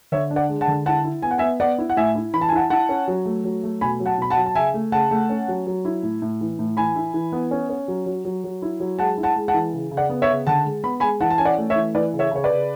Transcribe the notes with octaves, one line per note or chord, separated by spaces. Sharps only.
D3 C#5 E5
D4
D5 F#5
G#3
F#5 A5
D3
E4 F#5 A5
E4
B3 G#5
F#5
B3 E5 G#5
B3 D5 F#5
E4
F#5
A2 E5 G#5
E4
E3 B5
A5
G#5
E4 F#5 A5
E4 F#5 A5
C#4
F#3
A3
F#3
A3
B2 G#5 B5
F#3
F#5 A5
B2 B5
F#5 A5
F#3
A5
C#3 E5 G#5
A3
C#3 F#5 A5
A3
C#4
F#3
F#3
E4
A2
A2
E3
A2
E3 G#5 B5
E4
E3
B3
C#4
C#4
F#3
F#3
F#3
F#3
E4
F#3
G#3 F#5 A5
E4
F#5 A5
G#3
F#5 A5
E3
C#3
C#3
D5 F#5
B3
C#5 E5
C#3
D3 F#5 A5
G#3
B3 B5
G#3 G#5 B5
E3 F#5 A5
A5
C#4 G#5
D5 F#5
A3
C#5 E5
E3
E3 B4 D5
C#3
C#5 E5
C#3 C#5
B4 D5
C#3